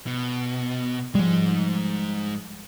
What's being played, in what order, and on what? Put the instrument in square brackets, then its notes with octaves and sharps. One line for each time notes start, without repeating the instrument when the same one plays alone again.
[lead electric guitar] B2
[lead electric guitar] G#2 G#3 [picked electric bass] F3 G3